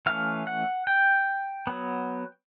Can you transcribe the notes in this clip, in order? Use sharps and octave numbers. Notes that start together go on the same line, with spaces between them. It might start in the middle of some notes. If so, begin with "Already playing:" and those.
E3 A3 C#4 F5
F#5
G5
F#3 B3